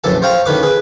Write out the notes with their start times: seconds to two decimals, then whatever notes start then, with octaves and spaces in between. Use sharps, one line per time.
0.04 A#1 F#2 A2 E3 A4 A5
0.22 C5 C#5 F5 G5 A#5
0.46 A1 A2 D#3 B4 D6
0.63 G#4 B4